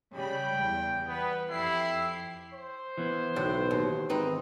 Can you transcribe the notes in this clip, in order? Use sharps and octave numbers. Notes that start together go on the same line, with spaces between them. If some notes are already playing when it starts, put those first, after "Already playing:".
C#3 G3 G5 B5
E2
G3 B3 B4
F2 E4 G4 C7
C5
E3 B3
B1 A2 D3
D#2
G#1 C4 D#4 B4